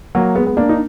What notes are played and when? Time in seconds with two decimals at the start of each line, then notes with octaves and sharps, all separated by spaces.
0.15 F#3 A#3
0.35 G#3 B3
0.47 B3
0.57 A#3 D4
0.69 D#4